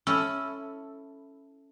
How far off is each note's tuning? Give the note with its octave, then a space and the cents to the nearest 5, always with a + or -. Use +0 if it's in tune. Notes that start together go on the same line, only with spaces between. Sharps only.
C#4 +0 E4 +0 A4 +0